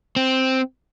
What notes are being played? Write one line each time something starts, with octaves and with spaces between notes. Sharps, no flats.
C4